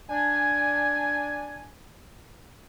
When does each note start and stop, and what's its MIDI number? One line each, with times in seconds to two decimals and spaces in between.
0.10 1.69 62
0.10 1.69 80